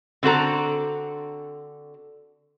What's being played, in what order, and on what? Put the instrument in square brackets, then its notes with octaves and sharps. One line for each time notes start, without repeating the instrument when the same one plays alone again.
[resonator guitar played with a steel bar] D3 C4 F#4 A4 A#5